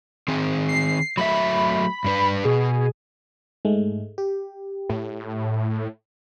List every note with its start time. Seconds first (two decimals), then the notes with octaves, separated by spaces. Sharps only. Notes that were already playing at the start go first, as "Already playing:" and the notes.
0.28 D#3 C4 G#4
0.69 C7
1.17 F#3 A3 E5 B5
2.04 G2 D4 B4
2.45 B2 G#4
3.65 G#2 G#3 A3
4.18 G4
4.89 A2